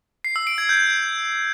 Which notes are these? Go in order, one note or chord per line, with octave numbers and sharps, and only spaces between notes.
C7
E6
D7
G#6
G6